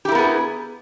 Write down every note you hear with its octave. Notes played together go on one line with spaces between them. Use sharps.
B3 E4 G4 G#4 A#4